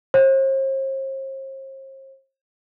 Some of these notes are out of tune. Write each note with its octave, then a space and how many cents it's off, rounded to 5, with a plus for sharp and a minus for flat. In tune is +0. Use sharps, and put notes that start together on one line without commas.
C5 +40